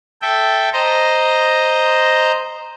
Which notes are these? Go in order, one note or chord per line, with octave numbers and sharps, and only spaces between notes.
A4 E5 G5
C5 D#5 A#5